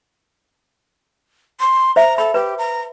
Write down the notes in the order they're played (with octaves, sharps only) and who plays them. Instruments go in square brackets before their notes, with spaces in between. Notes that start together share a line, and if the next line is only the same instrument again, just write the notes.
[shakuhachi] C6
[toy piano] C5 E5 [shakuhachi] A#5
[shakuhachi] A4 [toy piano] B5
[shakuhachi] G4 [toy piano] B4
[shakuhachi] A#5